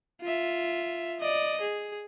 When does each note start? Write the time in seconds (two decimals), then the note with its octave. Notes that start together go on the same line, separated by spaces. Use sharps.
0.22 F4 E5
1.20 D5 D#5
1.61 G#4